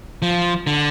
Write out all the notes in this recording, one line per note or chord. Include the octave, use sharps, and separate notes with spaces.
F3
D3